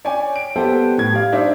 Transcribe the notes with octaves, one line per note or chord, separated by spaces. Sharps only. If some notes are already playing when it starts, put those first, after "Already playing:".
C#5 D5 G5 G#5
D7
G3 B3 G4 A4 C5 G5
A2 G#6
G3 F5
D4 D#4 C5 C#5 E5